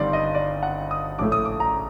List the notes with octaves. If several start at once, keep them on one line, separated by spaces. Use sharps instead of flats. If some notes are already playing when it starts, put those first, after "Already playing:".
Already playing: G1 G2 D#3 G3 C4 D5 C6
D#5
D5
F#5
D#6
A#1 A2 A3 D6
D#6
D6
A#5